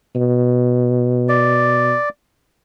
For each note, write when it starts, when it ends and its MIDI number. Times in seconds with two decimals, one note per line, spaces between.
0.16 1.94 47
1.29 2.09 74